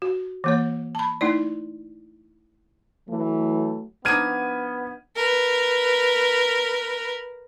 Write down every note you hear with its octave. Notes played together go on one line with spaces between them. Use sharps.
F#4
E3 A#3 C#5
A5 B5
A3 D#4 E4 D5
E3 F#3 A3
F3 B3 D4 D#4 F6 G#6 D#7
A#4 B4